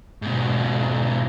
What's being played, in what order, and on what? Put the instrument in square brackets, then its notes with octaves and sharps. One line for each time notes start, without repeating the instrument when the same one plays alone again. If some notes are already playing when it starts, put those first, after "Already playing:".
[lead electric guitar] G#2 B2